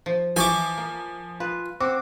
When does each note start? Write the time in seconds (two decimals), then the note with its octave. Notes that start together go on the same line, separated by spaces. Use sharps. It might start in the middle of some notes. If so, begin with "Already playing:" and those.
0.06 F3
0.36 E3 F3 E5 G#5 C#6 D6
0.77 A#3
1.40 F4 B4
1.80 C4 F#4 D6